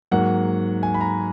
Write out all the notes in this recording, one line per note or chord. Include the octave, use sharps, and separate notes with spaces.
G#2 F#3 A#3 F#5
G#5
B5
A#5